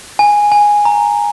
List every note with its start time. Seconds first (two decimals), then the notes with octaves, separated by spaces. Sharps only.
0.19 G#5
0.52 G#5
0.85 A#5